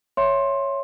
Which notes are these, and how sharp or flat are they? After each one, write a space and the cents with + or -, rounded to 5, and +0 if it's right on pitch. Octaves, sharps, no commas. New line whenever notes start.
C#5 -5 E5 +10 C6 +15